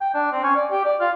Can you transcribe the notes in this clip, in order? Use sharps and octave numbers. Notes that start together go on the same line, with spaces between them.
G5
D4
C4
C#4
D5
G4
D5
F4